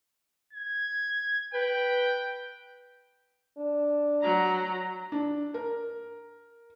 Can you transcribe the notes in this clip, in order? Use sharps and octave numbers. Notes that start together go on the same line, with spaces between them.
G#6
B4 G5
D4
F#3 A#5
D4
A#4